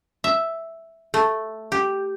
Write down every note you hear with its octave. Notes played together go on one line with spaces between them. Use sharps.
E5
A3
G4